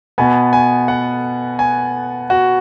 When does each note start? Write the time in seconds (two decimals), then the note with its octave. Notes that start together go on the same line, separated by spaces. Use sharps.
0.18 B2 B3 G#5
0.53 G#5
0.88 F#5
1.59 G#5
2.30 F#4